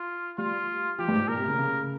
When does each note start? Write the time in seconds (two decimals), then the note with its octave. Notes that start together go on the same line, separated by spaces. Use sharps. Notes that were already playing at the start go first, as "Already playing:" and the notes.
Already playing: F4
0.38 G3 F4
0.99 F3 G4
1.08 G2
1.14 G#2
1.28 A#2 A#4
1.38 C3
1.48 C#3
1.58 C#3